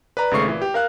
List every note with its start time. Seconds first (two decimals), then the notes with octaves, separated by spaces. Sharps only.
0.17 B4 D5 A#5
0.31 G#1 C#3 A3 C#6 C7
0.45 A#2 E3
0.62 G4
0.74 A#4 F5 F#6